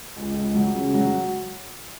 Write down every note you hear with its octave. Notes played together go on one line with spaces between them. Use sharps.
C#2
C#2
F#3
C#3
F#3